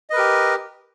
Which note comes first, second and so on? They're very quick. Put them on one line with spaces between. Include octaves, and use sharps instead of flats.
D#5 B4 A#4 G4